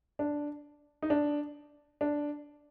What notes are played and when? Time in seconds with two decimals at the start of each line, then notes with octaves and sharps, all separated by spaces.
0.19 D4
1.02 D#4
1.10 D4
2.01 D4